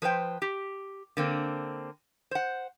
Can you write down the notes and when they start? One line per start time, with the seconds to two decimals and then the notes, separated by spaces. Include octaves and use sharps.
0.02 F3 B4 C5 G5
0.42 G4
1.17 D3 A#3 C4
2.31 C5 F#5